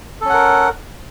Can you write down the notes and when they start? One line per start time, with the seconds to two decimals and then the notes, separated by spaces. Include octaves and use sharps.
0.21 A4
0.25 C#4
0.30 F#5
0.34 A#4